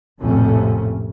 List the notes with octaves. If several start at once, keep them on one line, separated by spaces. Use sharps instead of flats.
A#1 F2 A2 C3 A3 C#4